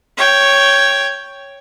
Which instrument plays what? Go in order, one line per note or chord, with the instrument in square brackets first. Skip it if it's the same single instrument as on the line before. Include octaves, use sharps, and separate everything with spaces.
[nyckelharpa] C#5 G5